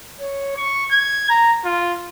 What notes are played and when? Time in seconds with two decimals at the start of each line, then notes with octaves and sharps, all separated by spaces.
0.20 C#5
0.56 C#6
0.91 G#6
1.29 A#5
1.65 F4